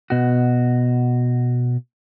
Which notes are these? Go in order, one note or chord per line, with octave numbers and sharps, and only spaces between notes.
B2 F#4